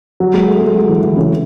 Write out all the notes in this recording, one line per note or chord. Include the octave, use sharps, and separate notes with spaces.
F#3
G#3
A3
G#3
F#3
E3
E3
C#3